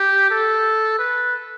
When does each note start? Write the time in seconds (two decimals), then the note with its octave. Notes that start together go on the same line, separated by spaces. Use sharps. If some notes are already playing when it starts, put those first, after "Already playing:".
Already playing: G4
0.31 A4
0.98 B4